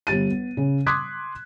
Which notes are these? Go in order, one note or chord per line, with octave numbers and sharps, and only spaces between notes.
G1 G4 A6 D#7
B3
C#3
C6 D6 D#6 F#6 G#6 B6